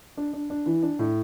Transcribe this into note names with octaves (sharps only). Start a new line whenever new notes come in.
D4
D4
D4
E3
D4
A2